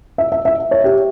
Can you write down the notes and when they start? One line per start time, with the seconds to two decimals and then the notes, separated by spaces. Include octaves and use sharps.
0.18 E5
0.32 E5
0.45 E5
0.71 C#5
0.84 G4